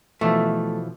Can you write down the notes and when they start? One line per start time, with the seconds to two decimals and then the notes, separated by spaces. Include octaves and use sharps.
0.21 B2 E3 F3 A3